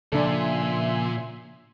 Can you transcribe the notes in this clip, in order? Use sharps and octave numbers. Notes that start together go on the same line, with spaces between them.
A#2 C#3 F3 D4 A4 E5 G#5 C6